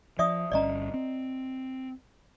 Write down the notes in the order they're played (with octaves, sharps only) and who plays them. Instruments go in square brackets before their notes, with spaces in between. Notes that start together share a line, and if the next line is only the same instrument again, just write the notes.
[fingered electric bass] F3 [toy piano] D5 E5 D#6
[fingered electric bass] G1 G2 C#4 [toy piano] D5 D#5 A#5
[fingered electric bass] C4